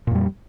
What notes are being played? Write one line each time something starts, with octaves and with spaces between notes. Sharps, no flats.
F2 A#2 G3